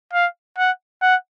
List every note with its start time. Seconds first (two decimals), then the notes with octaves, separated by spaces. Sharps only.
0.13 F5
0.58 F#5
1.02 F#5